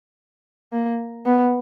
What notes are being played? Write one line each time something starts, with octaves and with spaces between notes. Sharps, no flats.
A#3
B3